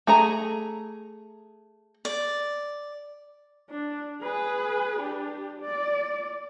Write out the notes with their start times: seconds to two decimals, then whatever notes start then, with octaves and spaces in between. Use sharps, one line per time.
0.07 A3 G#4 A#5
2.05 D5
3.70 D4
4.22 G#4 B4
4.99 D4 G4
5.60 D5